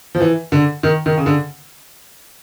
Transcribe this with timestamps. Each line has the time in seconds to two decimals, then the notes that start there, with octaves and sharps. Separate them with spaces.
0.15 F3
0.21 E3
0.52 D3
0.83 D#3
1.06 D#3
1.17 C#3
1.26 D3